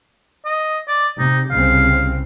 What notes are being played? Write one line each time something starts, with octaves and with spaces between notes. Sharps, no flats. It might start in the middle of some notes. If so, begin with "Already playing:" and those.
D#5
D5
C3 D#4
C2 C#3 C4 F5